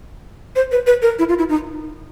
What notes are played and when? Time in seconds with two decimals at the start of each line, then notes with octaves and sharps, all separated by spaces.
0.56 C5
0.72 B4
0.87 B4
1.02 A#4
1.19 E4
1.29 F4
1.39 E4
1.49 D#4